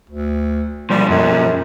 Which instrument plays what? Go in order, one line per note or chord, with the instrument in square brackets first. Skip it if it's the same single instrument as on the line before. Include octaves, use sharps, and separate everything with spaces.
[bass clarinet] D2
[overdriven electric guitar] B1 F3 [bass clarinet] G3
[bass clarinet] F#2